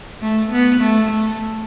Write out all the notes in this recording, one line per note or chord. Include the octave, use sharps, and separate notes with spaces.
A3
B3
A3
A3